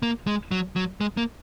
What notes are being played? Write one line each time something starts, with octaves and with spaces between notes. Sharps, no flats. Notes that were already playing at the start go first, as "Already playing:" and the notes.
A#3
G#3
F#3
F#3
G#3
A#3